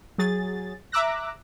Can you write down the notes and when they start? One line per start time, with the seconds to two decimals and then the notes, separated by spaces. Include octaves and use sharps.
0.18 F#3 G#4 A6
0.92 E5 A#5 D6 E6 F#6 A#6